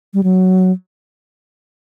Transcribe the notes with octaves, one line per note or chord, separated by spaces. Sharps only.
G3
F#3